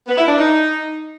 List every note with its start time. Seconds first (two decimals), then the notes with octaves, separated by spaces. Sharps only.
0.07 B3
0.18 E4
0.28 D4
0.38 D#4